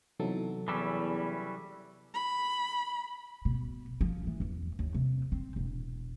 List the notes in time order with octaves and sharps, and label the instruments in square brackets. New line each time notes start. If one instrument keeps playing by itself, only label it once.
[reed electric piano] C3 F#3 A4 [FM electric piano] E3 B3 D#4
[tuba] E2 [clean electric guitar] E3 G3 C#4 [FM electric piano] A5 E6
[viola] B5
[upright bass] B2
F3
E3
E2
D#2
C3
C4
E1